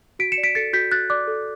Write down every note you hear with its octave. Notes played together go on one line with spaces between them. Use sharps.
F#4 B6 D7
C#7 E7
D5
B6 D7
A4 A6 C#7
F#4 G6 B6
F#4 F#6 A6
D5 D6 F#6
A4